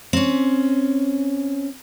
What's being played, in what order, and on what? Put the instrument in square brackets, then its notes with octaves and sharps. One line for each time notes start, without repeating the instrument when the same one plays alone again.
[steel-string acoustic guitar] C4 C#4